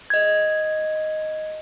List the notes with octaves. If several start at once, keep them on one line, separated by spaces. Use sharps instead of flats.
D#5 G#6